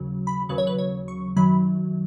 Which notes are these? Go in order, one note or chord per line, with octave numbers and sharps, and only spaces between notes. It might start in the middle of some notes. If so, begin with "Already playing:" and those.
Already playing: D#2 C#3 F#3
B5
D#2 C#3 F#3 B4
C#5
B4
C#5
C#6
F#2 D#3 F#3 B5